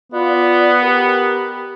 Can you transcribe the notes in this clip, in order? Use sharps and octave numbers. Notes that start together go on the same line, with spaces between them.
B3 F4 D5
G4 A#4